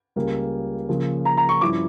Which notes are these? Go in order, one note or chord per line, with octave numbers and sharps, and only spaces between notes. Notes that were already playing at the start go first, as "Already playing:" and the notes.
C#2 C#3 G3 A#3
C#3 F3 A#3
A#5
A#5
C#6
G2 F3 C#4 E4 D6